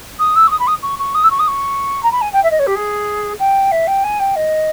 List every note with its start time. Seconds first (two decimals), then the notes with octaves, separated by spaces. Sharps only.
0.19 D#6
0.36 E6
0.47 C#6
0.51 D#6
0.60 B5
0.67 D#6
0.83 C#6
0.99 C#6
1.15 D#6
1.24 E6
1.31 C#6
1.40 D#6
1.48 C#6
2.03 A#5
2.12 B5
2.21 G#5
2.33 G5
2.43 E5
2.51 D#5
2.59 C#5
2.67 G4
2.76 G#4
3.40 G5
3.72 E5
3.87 G5
4.04 G#5
4.20 G5
4.36 D#5